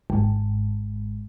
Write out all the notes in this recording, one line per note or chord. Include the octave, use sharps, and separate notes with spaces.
G#1